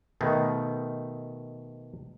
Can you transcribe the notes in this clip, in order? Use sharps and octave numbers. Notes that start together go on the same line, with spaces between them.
B2 D#3 A3